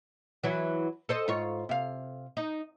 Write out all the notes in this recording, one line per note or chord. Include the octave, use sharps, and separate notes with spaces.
E3 F#3 E4
A4 C5 D#5
G#2 F4 C#5
C3 F5
D#4